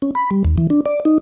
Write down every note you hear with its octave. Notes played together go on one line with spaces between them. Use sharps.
C#4
B5
G3
D#2
E3
D4
D5
D#4